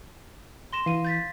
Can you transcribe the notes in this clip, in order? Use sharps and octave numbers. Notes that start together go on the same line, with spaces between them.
C6 A#6 E7
E3 F5 D#7
G6 A6 B6